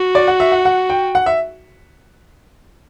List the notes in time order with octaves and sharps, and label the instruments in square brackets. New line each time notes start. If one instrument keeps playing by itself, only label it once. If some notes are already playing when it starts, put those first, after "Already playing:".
Already playing: [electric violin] F#4
[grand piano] D5
F#5
E5
F#5
F#5
G5
F#5
E5